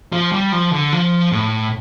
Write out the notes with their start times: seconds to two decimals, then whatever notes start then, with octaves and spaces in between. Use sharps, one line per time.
0.13 F3
0.32 G3
0.52 F3
0.72 D3
0.92 F3
1.32 A2